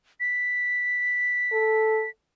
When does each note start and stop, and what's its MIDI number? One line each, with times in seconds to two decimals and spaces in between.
0.20 2.10 95
1.53 2.05 69